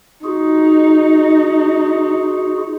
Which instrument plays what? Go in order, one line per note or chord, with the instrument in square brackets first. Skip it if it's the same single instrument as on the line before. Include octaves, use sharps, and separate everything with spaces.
[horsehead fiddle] D#4 [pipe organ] F4 F#4 G#4